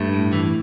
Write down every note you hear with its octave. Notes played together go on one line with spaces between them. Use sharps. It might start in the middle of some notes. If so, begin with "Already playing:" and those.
Already playing: G2 A3
A2
E3